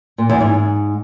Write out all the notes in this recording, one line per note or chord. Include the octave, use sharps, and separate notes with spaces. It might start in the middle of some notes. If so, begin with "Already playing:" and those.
A#2
E2
G#2